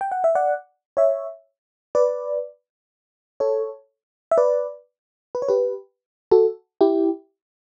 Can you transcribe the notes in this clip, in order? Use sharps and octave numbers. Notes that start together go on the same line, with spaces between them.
G5
F#5
E5
D5 F#5
C#5 E5
B4 D5
A4 C#5
E5
B4 D5
B4
C#5
G4 B4
F#4 A4
E4 G4